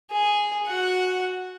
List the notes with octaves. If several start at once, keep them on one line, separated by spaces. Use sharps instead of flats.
G#4
F#4 F#5